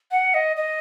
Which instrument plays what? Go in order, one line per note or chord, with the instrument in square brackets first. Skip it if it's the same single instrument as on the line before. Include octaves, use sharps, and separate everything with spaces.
[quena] F#5
D#5
D#5